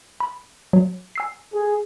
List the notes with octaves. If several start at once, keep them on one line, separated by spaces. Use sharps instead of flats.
B5
F#3
G#5 E6 C7
G#4